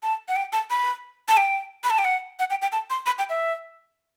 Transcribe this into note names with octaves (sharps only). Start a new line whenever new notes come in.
A5
F#5
G5
A5
B5
A5
G5
B5
A5
G5
F#5
F#5
G5
G5
A5
C6
B5
G5
E5